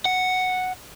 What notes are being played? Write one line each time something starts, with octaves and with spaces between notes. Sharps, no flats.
F#5